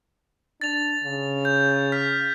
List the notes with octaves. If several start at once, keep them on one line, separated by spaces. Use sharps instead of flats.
D4 A6 F7
C#3
G6
F6 B6